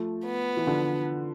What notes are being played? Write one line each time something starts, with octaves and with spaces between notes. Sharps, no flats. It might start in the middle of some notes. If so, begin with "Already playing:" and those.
Already playing: F3 A3
B3
E3
D3 F3